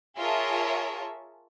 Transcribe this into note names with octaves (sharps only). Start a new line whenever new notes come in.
F4 G#4 A#4 C#5 E5 A5